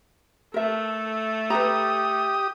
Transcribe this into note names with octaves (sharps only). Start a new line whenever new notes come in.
A3 A4 A#4 E5
G4 B4 A#5 D#6